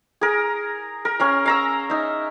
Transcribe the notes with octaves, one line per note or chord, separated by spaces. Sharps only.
G#4 A#4
A#4
C#4 A#4 F5
F5 A#5 E6
D#4 E5